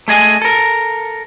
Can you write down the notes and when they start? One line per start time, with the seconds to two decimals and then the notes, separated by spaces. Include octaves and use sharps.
0.08 A3 G#4 D#5 G#5
0.42 A4 A#4